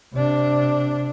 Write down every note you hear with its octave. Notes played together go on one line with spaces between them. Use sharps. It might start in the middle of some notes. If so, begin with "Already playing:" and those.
C3 D4